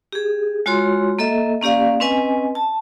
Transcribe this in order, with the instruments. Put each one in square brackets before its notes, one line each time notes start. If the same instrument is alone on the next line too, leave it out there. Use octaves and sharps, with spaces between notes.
[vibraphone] G4 G#4
G#3 F4 F#4 C#5 C6
A#3 A4 D#5 E5
A#3 C#4 G4 D5 F5
C4 C#4 B4 D#5 G#5
A5